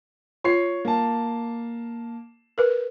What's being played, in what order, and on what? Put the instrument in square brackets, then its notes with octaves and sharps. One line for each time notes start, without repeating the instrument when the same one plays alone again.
[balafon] F4 [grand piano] C#5 C7
[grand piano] A#3 A5
[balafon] A#4 B4